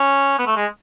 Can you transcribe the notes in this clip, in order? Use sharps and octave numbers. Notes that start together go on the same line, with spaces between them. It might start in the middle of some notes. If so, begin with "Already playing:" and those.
Already playing: C#4
B3
A3
G#3